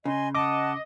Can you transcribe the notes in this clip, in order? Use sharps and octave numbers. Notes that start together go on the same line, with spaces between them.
C#3 D#5 G#5 C6
D#5 F#5 A5 D6